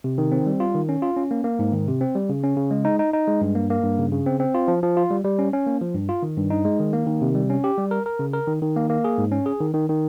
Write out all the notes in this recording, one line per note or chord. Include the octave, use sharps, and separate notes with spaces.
C3
D#3
C4
G3
F4
D#3
C#4
F4
C#4
A#3
A#3
G#2
D#3
C3
C4
G3
C#3
C#4
C#3
G#3
D#4
D#4
D#4
G#3
G2
A#3
A#3
G2
C#3
C#3
C4
C4
F4
F3
F3
F4
G3
G3
C#4
C#4
A#3
F3
G2
F4
D#3
G2
D#4
G#3
D#3
A#3
D#3
C3
G3
C#4
G4
G3
A#4
A#4
C#3
A#4
D#3
D#3
A#3
A#3
G#4
G#2
C#4
G#4
D#3
D#3
D#3